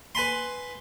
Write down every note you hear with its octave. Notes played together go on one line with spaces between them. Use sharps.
B4 G#5 B5 C6